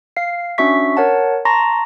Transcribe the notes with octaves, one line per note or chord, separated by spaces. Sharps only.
F5 C7
C#4 D4 F#4 E5 C#6 B6
A#4 C#5 F#5 A5
A5 A#5 C6 C#6 A#6